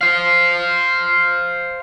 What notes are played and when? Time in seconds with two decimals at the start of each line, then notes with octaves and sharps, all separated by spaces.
0.01 C5 F5